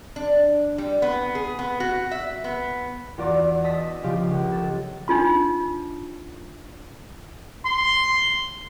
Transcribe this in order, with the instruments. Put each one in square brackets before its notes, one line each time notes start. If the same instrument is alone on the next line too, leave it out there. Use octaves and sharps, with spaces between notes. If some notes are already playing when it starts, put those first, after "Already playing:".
[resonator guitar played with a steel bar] D4
G3
B3
G#4
B3
F#4
E5
B3
[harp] E2 F4 F#4 D5 A#5
D#5 A5 E6 B6
C#3 F3 F4 G4
C#2
A4
[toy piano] D4 D#4 F4 C6
[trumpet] C6